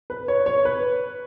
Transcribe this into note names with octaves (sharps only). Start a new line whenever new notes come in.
B4
C#5
C#5
B4